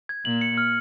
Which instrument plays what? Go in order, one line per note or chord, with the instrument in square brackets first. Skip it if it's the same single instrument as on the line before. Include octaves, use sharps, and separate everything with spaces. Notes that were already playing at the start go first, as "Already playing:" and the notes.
[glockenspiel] G#6
[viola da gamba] A#2 [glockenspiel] F#7
[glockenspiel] C#7
F6